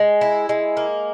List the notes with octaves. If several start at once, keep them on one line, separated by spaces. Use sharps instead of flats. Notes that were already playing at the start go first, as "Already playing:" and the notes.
Already playing: G#3
E4
G#3
A#3